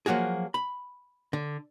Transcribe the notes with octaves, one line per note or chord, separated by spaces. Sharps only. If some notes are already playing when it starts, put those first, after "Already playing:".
F3 F#3 A#3 F#4 G#4
B5
D3